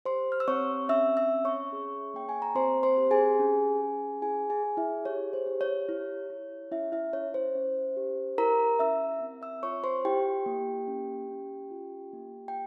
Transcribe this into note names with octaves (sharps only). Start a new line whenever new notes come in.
G4 C5 C6
F6
E6
C4 C#5 C#6
C#4 E5 E6
E5 E6
C#4
C#5 C#6
G#4
A#3 G5
G#5
A#5
C4 C5 C6
C5 C6
G4
G#4 G#5
C#4
G#4
E4 G#4 G#5
G#4 G#5
G#4
E4 E5
G4 C#5
C5
G4
C#5
E4
E4
C#4 E4 E5
E4 E5
C#4 C#5
C5
C#4
G4
E4 A#4 A#5
C#4 E5 E6
C4
E5 E6
F4 C#5 C#6
C5 C6
E4 G4 G5
A#3
C#4
C#4
F4
A#3
G5